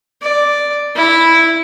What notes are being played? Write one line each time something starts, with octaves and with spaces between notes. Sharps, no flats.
D5
E4